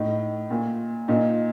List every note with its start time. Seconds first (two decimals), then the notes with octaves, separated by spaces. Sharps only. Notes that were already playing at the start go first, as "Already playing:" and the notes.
Already playing: A2 D#4
0.50 A#2
1.08 A#2 D#4